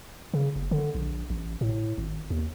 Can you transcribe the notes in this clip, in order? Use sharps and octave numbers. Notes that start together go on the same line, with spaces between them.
C#3
F#1
D3
A#1
A1
A2
G#1
D#2